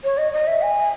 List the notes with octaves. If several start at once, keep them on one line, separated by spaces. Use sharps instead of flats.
C#5
D#5
D#5
E5
G#5